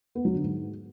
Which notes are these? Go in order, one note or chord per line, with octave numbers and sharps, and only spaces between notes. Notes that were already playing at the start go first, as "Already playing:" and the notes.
B3
F#3
D3
G#2